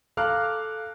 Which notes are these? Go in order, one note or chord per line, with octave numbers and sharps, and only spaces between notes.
A4 F5 A#5 D6 F6 F#6